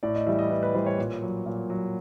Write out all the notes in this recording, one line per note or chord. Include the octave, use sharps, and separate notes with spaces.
A2 D5
D#5
E3 G3 E5
D#5
A2 B4
B4
E3 G3 C5
C#5
A#2
F#3
A#2
F#3